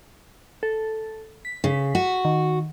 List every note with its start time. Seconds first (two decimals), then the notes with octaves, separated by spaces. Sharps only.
0.63 A4
1.45 B6
1.64 C#3
1.95 F#4
2.25 D#3